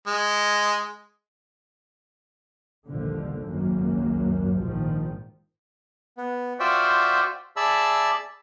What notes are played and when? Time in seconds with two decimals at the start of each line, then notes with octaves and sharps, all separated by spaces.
0.07 G#3
2.87 A#1 D#2 A#2 D3 F3 G3
3.41 G#1 C#2 F#2 A#3
4.59 A#1 G#2 D#3 F3
6.18 B3
6.60 F4 F#4 C5 D5 E5 G5
7.57 G#4 D5 E5 A5 B5 E6